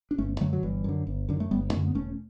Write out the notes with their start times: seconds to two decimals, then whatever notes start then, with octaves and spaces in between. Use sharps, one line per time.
0.11 D4
0.18 G1 A3 C#4
0.41 F#2 D3 F#3 A3
0.53 F#3
0.63 G1 E3 G3
0.84 F#2 D3
1.07 G1
1.29 F#2 D3
1.40 A3
1.51 G1 G3 B3
1.73 F#2 D3 A3 C#4
1.87 B3
1.95 E1 A3 C#4